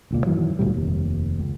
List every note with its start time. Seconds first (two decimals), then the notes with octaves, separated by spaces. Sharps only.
0.11 E1 C#2 A#2
0.26 F#2 D#3 E3 F#3
0.59 G1 D2 A#2 G3
0.74 F1 D#2
1.39 C#2